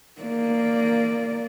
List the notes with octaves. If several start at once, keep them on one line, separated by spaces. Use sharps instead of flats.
A#3 D5